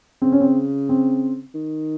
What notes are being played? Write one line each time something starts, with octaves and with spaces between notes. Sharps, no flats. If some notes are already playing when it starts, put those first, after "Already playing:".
C#3 C4
C#4
C4
C4
D#3